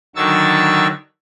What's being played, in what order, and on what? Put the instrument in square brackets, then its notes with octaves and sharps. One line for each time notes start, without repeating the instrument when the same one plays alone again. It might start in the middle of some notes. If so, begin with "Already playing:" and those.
[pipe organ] D3 D#3 F#3 C#6 E6 A6